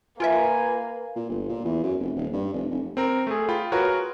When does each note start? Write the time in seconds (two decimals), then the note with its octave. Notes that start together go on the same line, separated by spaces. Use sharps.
0.20 A#3 F4 A#4 B4 E5 G#5
1.16 A#2
1.29 G1
1.49 A#2
1.64 E2
1.83 F#2
2.00 F1
2.16 D#1
2.33 G2
2.53 F1
2.71 F1
2.97 C4 A#4
3.27 A3 G#4
3.49 F4 G5 B5
3.72 F4 F#4 G#4 A#4 B4 C#5